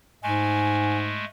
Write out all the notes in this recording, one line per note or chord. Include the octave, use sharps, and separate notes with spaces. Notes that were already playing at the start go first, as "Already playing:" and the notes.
G#2 G#3 A3 G#5